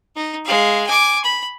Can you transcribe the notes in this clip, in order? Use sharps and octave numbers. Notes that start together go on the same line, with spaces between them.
D#4
G#3 F5
G#5 D6
B5